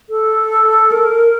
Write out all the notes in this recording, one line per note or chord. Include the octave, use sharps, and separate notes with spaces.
A4
A#4